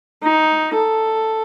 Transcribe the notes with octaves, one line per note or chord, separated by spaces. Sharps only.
D#4
A4